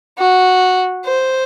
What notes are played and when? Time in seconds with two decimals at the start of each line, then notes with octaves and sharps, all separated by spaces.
0.18 F#4
1.05 C5